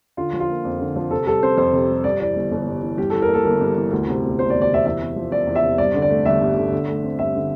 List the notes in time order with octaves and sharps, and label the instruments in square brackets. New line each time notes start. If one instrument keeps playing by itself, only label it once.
[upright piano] D3 F4
F3
F4
A#3
F2
D3
F3
C3 A4
G3 A4
C4 C5
F2 C5
C3
G3
G2 D5
E3 D5
G1
G1
G2
E3
G2 G4
E3 A4
A#4
A#3
A4
G1 A#4
G2
E3
D2
C3
E1
E1 C5
D5
D2
D5
C3 E5
E2 E5
C3
F3
E1 D5
E2
E5
C3
G2 D5
D3
D5
A3
G1 E5
G2
D3
D3
A3
C4
G2 E5
D3